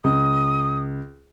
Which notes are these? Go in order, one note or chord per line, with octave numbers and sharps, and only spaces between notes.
C#2 D#6